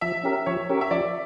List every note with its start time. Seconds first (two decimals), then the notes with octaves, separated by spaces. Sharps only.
0.01 F3 E5
0.23 C#4 G4 A#4
0.46 F3 C#5
0.70 C#4 G4 A#4
0.81 E5
0.91 F3 D5